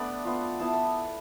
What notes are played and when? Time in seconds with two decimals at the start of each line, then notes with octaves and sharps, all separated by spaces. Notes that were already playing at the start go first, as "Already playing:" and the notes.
Already playing: A3 B3 D4 D5 B5
0.25 B3 F4
0.60 B3 E4 A5
0.74 B5